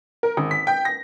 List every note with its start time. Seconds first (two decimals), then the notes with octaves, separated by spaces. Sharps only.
0.23 A#4
0.37 G#1
0.51 B6
0.67 G5
0.85 A#6